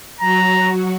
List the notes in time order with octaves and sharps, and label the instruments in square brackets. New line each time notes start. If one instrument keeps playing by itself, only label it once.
[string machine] F#3 F#4 [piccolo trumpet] A#5